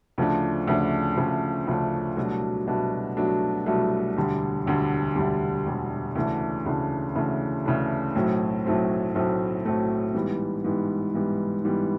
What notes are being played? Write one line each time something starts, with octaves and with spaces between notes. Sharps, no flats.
D2 C#3 F3 A3 D4
D2 C#3 F3 A3 D4
D2 C#3 F3 A3 D4
D2 C#3 F3 A3 D4
C2 B2 F#3 A3 D4
C2 B2 F#3 A3 D4
C2 B2 F#3 A3 D4
C2 B2 F#3 A3 D4
E1 D2 D3 G3
E1 D2 D3 G3
E1 D2 D3 G3
E1 D2 D3 G3
D2 C#3 E3 A3 D4
D2 C#3 E3 A3 D4
D2 C#3 E3 A3 D4
D2 C#3 E3 A3 D4
B1 A2 F#3 A3 C4
B1 A2 F#3 A3 C4
B1 A2 F#3 A3 C4
B1 A2 F#3 A3 C4
G#2 E3 G3 B3
G#2 E3 G3 B3
G#2 E3 G3 B3
G#2 E3 G3 B3